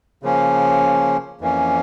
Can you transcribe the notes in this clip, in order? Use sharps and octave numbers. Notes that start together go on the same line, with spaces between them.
C#3 F3 A#3 C#4
F2 E3 A#3 C#4